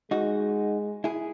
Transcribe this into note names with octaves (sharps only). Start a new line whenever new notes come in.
G#3 D#4 F#4
E4 G#4